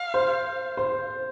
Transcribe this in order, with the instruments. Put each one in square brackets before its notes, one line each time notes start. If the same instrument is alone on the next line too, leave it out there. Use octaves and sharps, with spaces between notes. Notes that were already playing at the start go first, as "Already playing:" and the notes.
Already playing: [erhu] F5
[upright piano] C5
C5